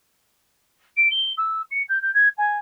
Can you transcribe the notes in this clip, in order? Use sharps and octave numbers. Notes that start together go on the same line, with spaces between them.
D7
G7
E6
C#7
G6
G6
G#6
G#5